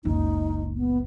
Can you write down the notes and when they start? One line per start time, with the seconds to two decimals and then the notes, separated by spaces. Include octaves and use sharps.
0.05 F#1 C#2 D#4
0.76 B3